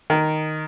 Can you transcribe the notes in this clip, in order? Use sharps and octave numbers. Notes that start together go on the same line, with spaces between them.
D#3